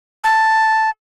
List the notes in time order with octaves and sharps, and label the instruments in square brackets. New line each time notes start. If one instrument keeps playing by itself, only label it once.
[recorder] A5